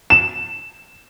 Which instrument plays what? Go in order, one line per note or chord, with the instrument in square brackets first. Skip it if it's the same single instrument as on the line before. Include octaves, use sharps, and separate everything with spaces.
[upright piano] E7